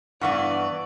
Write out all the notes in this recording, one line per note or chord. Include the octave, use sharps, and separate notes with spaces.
G2 E3 B3 D5 F#5 C#6